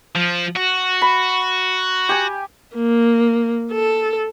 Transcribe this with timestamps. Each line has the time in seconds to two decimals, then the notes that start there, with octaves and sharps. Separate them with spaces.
0.15 F3
0.56 F#4
1.02 B5
2.09 G4 G#5
2.75 A#3
3.72 A4